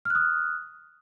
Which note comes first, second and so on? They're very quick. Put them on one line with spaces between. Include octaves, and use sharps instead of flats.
F6 F#6 D#6